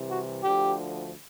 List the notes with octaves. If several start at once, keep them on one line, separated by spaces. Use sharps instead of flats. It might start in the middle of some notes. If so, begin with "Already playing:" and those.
Already playing: C2 C3 E3
F#4
D2 D3 F3 G4